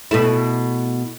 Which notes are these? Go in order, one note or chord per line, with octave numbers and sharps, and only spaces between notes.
B2 A3 E4